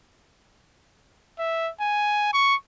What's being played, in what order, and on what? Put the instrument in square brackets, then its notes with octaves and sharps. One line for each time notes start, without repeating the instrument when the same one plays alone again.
[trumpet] E5
G#5
C#6